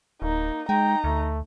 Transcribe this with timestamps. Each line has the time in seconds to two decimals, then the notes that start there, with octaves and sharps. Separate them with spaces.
0.22 D1 A#3 D#4
0.69 G#3 D#4 G5 A#5
1.04 D2 A3